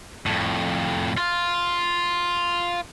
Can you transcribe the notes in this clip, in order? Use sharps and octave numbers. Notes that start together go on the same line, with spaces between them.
F2 A2
F4